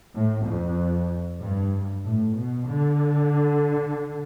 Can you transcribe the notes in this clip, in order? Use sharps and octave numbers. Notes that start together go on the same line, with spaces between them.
A2
F2
G2
A2
B2
D3